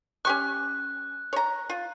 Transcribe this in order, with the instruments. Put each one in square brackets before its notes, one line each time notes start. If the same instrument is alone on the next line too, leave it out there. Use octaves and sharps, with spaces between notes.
[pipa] C#4 G4 C#6 [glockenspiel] F#6
[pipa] C#5 A#5
F4